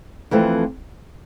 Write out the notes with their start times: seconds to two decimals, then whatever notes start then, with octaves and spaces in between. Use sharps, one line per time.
0.31 F2 E3 A3 C4